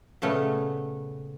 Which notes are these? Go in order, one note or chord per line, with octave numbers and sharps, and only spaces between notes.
A#2 C#3 A3 B3